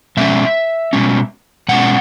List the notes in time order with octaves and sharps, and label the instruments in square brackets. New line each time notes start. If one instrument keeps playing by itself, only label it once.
[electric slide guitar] B2 G#3 C#4 E5
B2 G#3 C#4
B2 G#3 C#4 F#5